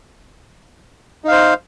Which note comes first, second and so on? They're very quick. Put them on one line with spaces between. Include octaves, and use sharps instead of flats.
D#4 F5 C5